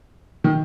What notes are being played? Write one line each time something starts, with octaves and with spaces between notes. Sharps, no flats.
D#3